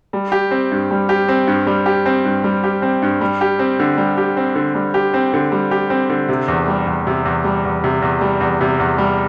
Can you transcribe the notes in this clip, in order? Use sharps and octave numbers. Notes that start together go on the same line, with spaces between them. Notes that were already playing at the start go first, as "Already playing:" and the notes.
G3
G4
C4
G2
G3
G4
C4
G2
G3
G4
C4
G2
G3
G4
C4
G2
G3
G4
C4
D3
G3
G4
C4
D3
G3
G4
C4
D3
G3
G4
C4
D3
C3
E2
G3
E2
C3
E2
G3
E2
C3
E2
G3
E2
C3
E2
G3